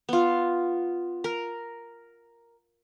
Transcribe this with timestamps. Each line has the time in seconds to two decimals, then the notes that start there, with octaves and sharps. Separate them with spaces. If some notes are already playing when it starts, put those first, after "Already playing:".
0.09 B3 F4
1.24 A#4